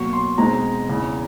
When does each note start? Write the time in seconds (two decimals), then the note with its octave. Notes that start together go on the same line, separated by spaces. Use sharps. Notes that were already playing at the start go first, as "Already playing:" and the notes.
Already playing: B2 F#3 A#3 C#6
0.13 C6
0.38 B2 G#3 C4 D#4 A#5
0.89 E2 C#3 E3